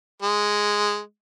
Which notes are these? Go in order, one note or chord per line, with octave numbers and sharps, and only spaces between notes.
G#3